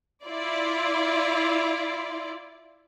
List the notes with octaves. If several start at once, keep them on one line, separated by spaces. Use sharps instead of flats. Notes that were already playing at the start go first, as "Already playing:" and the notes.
E4 F4 D5